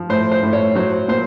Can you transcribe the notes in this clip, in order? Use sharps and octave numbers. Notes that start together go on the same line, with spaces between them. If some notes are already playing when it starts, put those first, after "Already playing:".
Already playing: F3
A2 C5
C5
A2
C#5
F#3 C5
A#2 C5